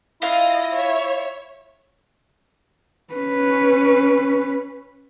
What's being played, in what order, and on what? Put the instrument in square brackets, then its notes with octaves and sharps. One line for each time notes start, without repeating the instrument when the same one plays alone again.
[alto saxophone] E4 [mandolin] F4 F5 [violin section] D#5 A#6
[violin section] C#5 E5
[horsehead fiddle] C#4 B4